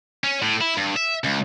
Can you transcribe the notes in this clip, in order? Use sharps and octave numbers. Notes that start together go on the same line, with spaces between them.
C#4
A2
E4
G2
E5
C#2